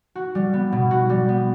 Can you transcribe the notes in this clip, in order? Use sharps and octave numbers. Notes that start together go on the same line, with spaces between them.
F#4
G3
B3
B2
F#4
G3
B3